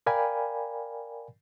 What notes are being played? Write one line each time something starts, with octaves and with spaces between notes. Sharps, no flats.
A#4 D5 F5 G5 G#5 B5